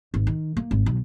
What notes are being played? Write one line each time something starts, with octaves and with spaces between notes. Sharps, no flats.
G#1
D#3
A#3
G#1
B1